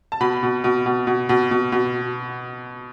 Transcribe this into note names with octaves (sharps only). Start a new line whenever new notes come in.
A5
B2 B5
B2
B2
B2
B2
B2
B2
B2